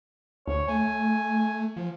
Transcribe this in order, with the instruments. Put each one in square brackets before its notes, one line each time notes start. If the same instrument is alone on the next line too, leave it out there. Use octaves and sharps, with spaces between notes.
[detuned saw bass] D2 [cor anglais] C#5
[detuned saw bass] A3 [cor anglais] G#5
[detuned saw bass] F3